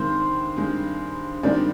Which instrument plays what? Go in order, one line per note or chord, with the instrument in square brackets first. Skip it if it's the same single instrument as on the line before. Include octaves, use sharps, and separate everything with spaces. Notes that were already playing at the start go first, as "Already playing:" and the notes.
Already playing: [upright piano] G2 D#3 G#3 C4 C5
G2 D#3 G#3 C4
G2 D#3 G#3 C4 D5